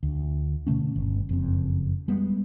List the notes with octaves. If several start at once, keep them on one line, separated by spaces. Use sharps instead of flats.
D2
B2 D3 A3 C#4
G1
F#1 F2 C4
G3 G#3 B3